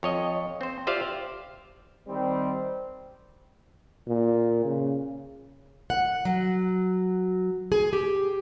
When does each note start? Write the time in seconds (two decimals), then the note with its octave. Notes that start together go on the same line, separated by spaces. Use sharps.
0.03 F2 C#5 D#5
0.61 C4 C5
0.87 F4 G4 C5 D5 E5 F5
2.08 D#3 G3 C4
4.07 A#2
4.65 C#3
5.90 F#5
6.25 F#3
7.72 G#4
7.93 G4